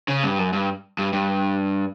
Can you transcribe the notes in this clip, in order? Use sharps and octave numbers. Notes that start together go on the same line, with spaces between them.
C#3
G2
F#2
G2
G2
G2